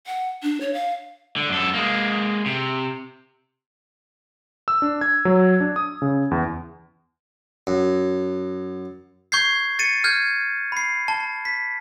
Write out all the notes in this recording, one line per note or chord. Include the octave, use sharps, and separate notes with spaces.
F#5
D4
C#5
F5
D3
F#2 A4
G#3 A#3
C3
E6
D4
G#6
F#3
D4
D#6
C#3
E2
F#2
C#6 G6 G#6 C7
A6 C#7 D#7
F6 G6 G#6
B5 C7
A5
B6